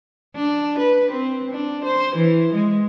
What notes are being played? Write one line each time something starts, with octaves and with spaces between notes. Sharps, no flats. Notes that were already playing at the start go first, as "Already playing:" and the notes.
D4
B4
C4
D4
C5
E3
G#3